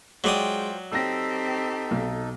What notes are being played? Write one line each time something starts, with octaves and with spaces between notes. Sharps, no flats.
F#3 G#3 F4 C5 D5 G5 D#6
C4 D#4 G4 A4 E6 A#6
B1